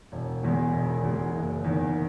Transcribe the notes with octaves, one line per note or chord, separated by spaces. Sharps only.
E1
E2 B2 G#3
E1
E2 B2 G#3
F#1
E2 D#3